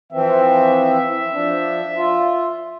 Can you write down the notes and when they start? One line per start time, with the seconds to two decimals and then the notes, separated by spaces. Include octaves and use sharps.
0.12 E3 F3 C4 E5
1.33 F3 D4
1.96 F4